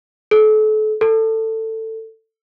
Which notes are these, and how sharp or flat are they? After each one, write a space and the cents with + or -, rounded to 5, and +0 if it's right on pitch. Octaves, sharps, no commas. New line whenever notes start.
A4 -35
A4 +15